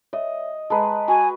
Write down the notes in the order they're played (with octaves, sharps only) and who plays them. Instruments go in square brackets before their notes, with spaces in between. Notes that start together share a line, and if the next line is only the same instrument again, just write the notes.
[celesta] C#5 E5 [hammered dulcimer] D#5
[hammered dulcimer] G#3 B4 [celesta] A5 A#5
[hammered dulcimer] F#4 [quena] G#5